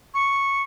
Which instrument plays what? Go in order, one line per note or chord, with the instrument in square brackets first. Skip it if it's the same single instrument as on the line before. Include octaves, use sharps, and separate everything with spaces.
[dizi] C#6